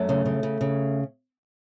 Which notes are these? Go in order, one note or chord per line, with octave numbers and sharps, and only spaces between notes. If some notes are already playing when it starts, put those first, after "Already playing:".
Already playing: F#2 A3
C#3
C#3
C#3
C#3